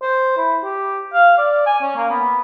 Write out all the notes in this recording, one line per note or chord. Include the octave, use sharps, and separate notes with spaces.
C5
E4
G4
F5
D5
G#5
C#4
A#3
B3